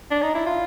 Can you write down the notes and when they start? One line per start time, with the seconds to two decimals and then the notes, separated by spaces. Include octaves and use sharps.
0.11 D4
0.22 D#4
0.35 E4
0.46 F4